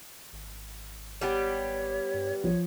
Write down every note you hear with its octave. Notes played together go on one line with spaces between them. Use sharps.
G#1
G3 B3 G4 C#5
G2
B1 F3 C#5